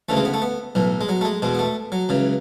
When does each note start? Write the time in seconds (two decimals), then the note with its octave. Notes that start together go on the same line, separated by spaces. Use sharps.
0.09 D2 C#3 E3 A3
0.17 G#3
0.25 B3
0.34 A3
0.42 B3
0.75 B1 A2 E3
1.01 G#3
1.09 F#3
1.21 A3
1.25 G#3
1.42 E2 B2 G#3
1.55 B3
1.59 A3
1.92 F#3
2.09 C#2 C#3 E3